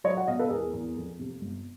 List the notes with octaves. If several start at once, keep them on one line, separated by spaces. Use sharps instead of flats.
F#3 C#5 D#5
F#5
B2 D#5 F5
A4 B4
E2 G#4 A#4
E2
F2
C3
G1